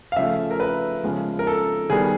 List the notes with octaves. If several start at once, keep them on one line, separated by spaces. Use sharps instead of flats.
F5
C#3 F3 A3 E5
A#4
B4
C#3 F3 G#3 B3
A#4
A4
D#3 G3 B3 G#4